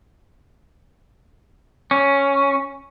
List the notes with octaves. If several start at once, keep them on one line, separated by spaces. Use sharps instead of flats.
C#4